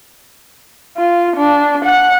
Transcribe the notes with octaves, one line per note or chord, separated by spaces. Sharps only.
F4
D4
F#5